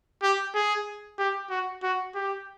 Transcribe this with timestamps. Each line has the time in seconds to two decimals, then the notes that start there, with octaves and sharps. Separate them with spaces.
0.23 G4
0.55 G#4
1.19 G4
1.50 F#4
1.83 F#4
2.15 G4